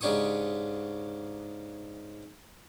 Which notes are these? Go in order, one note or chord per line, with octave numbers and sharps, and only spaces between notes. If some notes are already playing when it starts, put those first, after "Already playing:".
G#2 C#3 D4 G4 C#6 D#6